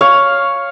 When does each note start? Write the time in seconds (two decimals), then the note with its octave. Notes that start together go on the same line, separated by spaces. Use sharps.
0.01 C#5 F5